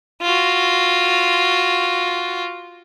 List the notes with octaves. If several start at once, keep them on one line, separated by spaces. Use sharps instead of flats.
F4 F#4